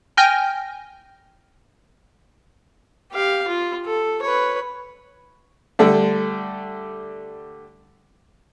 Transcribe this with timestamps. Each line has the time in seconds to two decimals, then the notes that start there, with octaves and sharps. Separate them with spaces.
0.17 G5 G#5 F6 G6 A#6
3.12 G4 F5
3.48 F4
3.85 A4
4.22 B4 C#5
5.79 D3 G3 A3